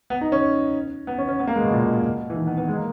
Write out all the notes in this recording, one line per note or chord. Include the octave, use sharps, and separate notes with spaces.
B3
D#4
C#4
B3
C#4
C#4
B3
A#3
G#3
B2
A#2
A#2
B2
E3
D#3
B3
B3
G#3
A#3